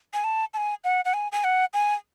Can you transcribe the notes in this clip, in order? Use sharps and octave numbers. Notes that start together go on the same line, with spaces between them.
G#5
A5
A5
G#5
F#5
F#5
G#5
G#5
F#5
G#5